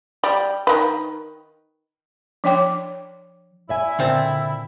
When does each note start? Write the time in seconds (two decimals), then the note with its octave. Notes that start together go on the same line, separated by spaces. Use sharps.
0.24 G3
0.67 D#3 B4
2.44 F3 D4 C#5 G5 D6
3.69 E4 D5 E5 G#5
3.99 A#2 D3 C4 A5